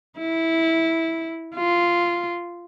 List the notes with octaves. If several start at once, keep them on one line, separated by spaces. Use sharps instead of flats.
E4
F4